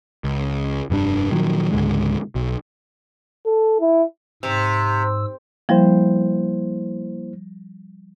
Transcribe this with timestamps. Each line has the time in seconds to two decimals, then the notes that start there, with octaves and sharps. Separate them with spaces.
0.24 C#2
0.90 F1 G2 G3 D4
1.31 A#2 D#3 F3 F#3
1.72 C#2 G#2 D3 G#3
2.35 B1
3.46 A4
3.80 E4
4.43 G#2 C3 E6
5.69 F3 G3 A#3 E4 C5